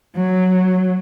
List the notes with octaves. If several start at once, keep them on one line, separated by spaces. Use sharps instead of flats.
F#3